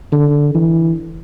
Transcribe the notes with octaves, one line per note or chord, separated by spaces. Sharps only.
D3
E3